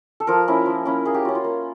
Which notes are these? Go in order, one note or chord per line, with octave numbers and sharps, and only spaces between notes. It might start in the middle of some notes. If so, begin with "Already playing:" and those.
A4
F3 A#4
A#3 C#4 E4
F3
A#3 C#4 E4
A#3 G#4
G4
C#4 F4 F#4
F4
A#3